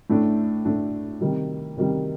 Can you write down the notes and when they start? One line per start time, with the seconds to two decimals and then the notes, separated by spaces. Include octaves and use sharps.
0.10 A2 A3 D4
0.65 A2 A3 D4
1.21 C3 D#3 G3
1.77 C3 D#3 G3